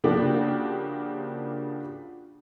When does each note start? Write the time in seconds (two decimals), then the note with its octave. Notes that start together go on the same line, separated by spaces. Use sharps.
0.04 C#3 F3 A#3 D4 F#4 G4